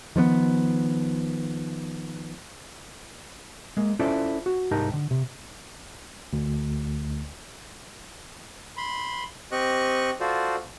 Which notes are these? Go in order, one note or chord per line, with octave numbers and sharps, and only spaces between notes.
D#3 F3 A3 B3
G#3 A#3
C#4 E4 F4 A4 C5 D5
F#4
C2 G#2 D#4 G4 A#4 A5
D3
C3
D2
B5 C6
C4 G4 D#5 C#6 F#6
F4 F#4 A4 C5 D5